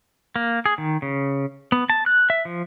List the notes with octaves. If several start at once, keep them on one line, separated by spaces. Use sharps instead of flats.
A#3
G#4
D#3
C#3
B3
A5
F#6
E5
F3